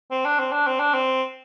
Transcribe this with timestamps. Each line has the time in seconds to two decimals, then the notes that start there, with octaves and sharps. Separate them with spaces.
0.11 C4
0.25 D4
0.39 C4
0.52 D4
0.67 C4
0.80 D4
0.94 C4